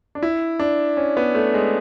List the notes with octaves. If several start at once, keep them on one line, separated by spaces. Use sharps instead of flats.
D4
E4
D4
C#4
B3
A3
G#3